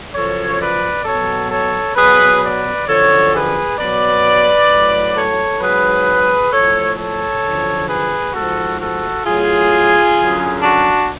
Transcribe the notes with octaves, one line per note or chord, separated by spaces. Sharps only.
F#2 C#3 F3 A4 C#5
B4 D5
B2 F#3 A4 C#5
A4 C#5
B2 F#3 G#4 B4
B4 D5
F#2 D3 F3 A4 C#5
G#4 B4
B2 F#3 B4 D5
A2 F#3
A4 C#5
G#2 F#3 G#4 B4
A2 F3 A4 C#5
A4 C#5
F#2 D3 F3
G#4 B4
G#2 F3 F#4 A4
F#4 A4
A2 F#3 F4 G#4
F#2 D3 F#3
D4 F#4